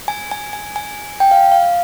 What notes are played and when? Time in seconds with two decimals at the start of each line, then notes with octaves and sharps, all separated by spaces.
0.08 G#5
0.31 G#5
0.53 G#5
0.76 G#5
1.20 G5
1.31 F5
1.52 F5